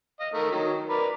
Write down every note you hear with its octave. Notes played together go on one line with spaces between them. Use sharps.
D#5 F5
D#3 A3 A#4
D#3 F#3
A#4 B4 D5